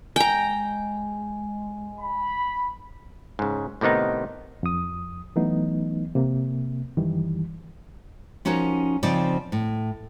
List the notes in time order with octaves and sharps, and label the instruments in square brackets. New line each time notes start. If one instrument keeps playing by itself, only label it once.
[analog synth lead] G#3 [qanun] G5 A#5 [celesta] G#5
[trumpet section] B5
[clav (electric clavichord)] G#2 C#3
A2 C3 D#3 B3 D#4
[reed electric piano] F2 D#6
E3 F#3 A3 B3 D#4
C3 A#3
F#2 D#3 E3 G3
[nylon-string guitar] F3 C#4 D#4 F#4 A#4
C#3 F3 C4 D#4 D5 G5
A2